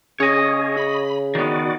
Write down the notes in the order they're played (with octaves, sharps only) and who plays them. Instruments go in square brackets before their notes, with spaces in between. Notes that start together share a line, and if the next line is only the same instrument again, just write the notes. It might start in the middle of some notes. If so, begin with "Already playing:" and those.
[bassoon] C#3 [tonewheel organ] C#4 G#4 [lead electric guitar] C#5 D#5
[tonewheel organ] B5
[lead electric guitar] D#3 B3 [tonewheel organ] F#4 D5